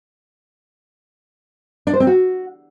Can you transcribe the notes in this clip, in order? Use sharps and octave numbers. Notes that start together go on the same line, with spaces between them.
D4
C5
C4
F#4